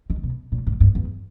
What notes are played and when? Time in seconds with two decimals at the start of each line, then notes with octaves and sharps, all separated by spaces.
0.10 D#3
0.23 B2
0.52 A#2
0.67 G#2
0.80 G2
0.95 E2